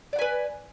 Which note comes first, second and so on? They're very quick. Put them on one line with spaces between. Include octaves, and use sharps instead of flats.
D5 F#5 G#5 B4